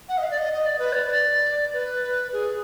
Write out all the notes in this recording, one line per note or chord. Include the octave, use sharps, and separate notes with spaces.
F#5
D#5
F5
D5
D#5
D#5
D5
B4
D5
B4
G#4